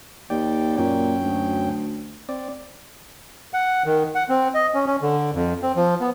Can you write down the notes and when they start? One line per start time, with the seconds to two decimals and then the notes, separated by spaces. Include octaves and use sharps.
0.30 D#2 D5 G5
0.78 F#2 A#2 C#4 G5
1.23 D2
2.29 C4 D5
3.54 F#5
3.85 D#3
4.15 F#5
4.29 C4
4.54 D#5
4.74 C#4
4.86 C#4
5.02 D3
5.34 F2
5.62 C4
5.76 F3
6.01 B3